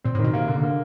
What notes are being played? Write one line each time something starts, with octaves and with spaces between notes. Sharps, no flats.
A#2 C4
A2
D#3
B2
C3 A#3
D3
A#3